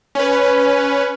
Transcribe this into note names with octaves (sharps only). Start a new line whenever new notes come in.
C#4 B4